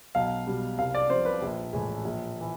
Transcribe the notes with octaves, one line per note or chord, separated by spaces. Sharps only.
B1 F5
B2 G3
C2 F5
D5
C3 F3 C5
B4
A#1
A2 E3 G#3
A#1
E3